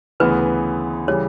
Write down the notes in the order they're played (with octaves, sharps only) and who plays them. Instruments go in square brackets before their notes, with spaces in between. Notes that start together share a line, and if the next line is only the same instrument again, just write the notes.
[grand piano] D2 C#3 E3 B3 [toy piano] B4
[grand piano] C#3 E3 G3 [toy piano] C#5